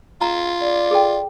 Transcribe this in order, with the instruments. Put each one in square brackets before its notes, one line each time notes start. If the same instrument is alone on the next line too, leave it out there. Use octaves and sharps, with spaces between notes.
[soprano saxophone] F4 [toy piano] A#5
[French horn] D5
[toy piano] G#4 A4 G5